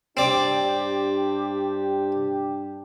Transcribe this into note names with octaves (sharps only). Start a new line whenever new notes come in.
G2 C4 D4 G4 D5